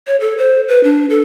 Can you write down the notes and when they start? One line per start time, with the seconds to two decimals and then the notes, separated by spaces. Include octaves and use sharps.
0.07 C#5
0.20 A4
0.38 C5
0.68 B4
0.84 D4
1.10 A4